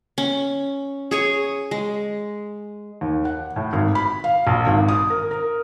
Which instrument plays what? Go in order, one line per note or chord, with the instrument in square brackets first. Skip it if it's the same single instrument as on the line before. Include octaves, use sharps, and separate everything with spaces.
[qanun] C#4
G#4 C#5 G#5
G#3
[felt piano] D#2
F#5
A2
G#1
B5
F5
A#1
G#1
D#6
A#4
A#4